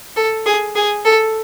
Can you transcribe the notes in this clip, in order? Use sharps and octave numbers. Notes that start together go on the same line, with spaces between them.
A4
G#4
G#4
A4